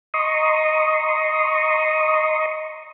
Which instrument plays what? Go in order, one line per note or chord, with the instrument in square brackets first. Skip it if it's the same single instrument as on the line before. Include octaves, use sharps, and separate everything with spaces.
[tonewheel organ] D#5 A#5 C6 C#6 D#6